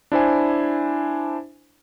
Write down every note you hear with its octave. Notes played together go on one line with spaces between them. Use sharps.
D4 E4 C5 G#5